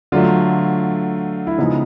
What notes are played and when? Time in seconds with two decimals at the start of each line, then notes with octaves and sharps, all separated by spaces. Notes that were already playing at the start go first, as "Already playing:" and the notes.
0.12 D3 F#3 A3 F4
1.47 E4
1.58 C#3 F3 G#3 B3 D#4